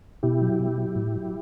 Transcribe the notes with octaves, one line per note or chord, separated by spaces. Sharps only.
B2 E4 G4
F#3
B2
F#3
A2
F#3